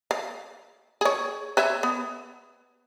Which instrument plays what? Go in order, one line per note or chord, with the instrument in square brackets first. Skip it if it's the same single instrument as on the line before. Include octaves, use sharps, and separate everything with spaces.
[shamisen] F5
G#4 C#5
B4 C#5 E5
B3